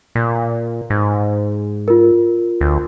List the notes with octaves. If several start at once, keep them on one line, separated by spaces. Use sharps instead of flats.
A#2
G#2
F4 A#4
D2